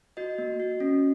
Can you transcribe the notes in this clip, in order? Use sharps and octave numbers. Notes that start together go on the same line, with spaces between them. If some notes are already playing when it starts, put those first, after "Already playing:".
F#4 D#5
A#3
F#4
C#4